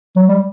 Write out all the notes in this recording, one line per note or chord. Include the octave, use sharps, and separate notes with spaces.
F#3
G3